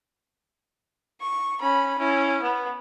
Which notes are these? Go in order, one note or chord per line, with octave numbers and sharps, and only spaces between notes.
C#6
C#4 B5
C#4 E4
B3